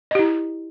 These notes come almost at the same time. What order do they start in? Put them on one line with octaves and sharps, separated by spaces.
D#5 G4 E4